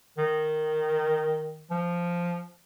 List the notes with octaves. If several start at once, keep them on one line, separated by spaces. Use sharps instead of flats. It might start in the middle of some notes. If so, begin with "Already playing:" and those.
D#3
F3